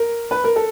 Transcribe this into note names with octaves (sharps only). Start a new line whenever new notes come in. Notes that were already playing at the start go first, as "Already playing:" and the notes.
Already playing: A#4
B4
A#4
A4